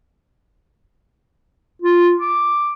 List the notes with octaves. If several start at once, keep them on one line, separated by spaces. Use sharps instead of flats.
F4
D6